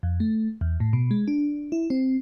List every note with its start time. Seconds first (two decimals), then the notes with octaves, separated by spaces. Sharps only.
0.03 F2
0.20 A3
0.61 E2
0.80 A2
0.93 B2
1.11 G#3
1.28 D4
1.72 E4
1.90 C4